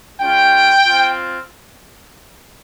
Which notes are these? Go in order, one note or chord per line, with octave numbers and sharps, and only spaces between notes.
G#3 C#4 F4 G5
C4 F4